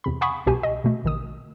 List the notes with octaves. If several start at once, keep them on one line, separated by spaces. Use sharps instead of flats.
E2 C3 B5
F5 F#5 G#5 B5 C#6 D#6
C2 B2 G4 G#5
D#5
B2 A3
A#1 D#3 D#6